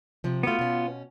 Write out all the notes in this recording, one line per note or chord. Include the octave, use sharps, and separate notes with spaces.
C3 F3
A3 B3 F4 F#4
B2 C#4